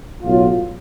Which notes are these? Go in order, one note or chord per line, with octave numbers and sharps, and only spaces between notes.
B1 A2 F#3 F4